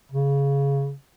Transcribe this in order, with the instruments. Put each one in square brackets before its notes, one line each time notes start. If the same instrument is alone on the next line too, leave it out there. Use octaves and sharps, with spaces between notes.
[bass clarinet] C#3